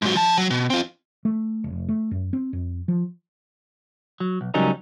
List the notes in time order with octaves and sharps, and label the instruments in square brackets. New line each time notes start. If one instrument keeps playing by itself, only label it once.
[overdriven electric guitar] G#2 F#3
F3 A5
F#3
B2
C4 F4
[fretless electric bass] A3
F1
A3
F#2
C4
F2
F3
[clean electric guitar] F#3
B1
C#2 F#3 G3 C#4 D#4 A#4